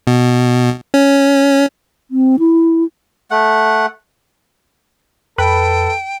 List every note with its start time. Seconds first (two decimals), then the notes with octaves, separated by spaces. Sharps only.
0.07 B2
0.94 C#4
2.10 C4
2.39 E4
3.31 A3 F#5
5.38 F2 A4 B4 G5 B5